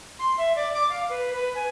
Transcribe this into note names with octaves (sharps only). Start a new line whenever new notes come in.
C6
E5
D5
D6
F5
B4
B4
G#5